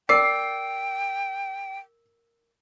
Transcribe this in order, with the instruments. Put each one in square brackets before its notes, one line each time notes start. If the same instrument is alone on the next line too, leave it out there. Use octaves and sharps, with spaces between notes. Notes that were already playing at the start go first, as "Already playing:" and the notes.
[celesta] A#4 E6 [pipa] D5 [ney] G5 [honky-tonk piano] C7